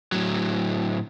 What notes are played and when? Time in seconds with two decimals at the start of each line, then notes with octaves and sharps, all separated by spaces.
0.12 A2 F#3